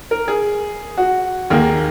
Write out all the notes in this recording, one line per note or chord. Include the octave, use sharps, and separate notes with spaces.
A#4
G#4
F#4
D#2 D#3 A#3 G#4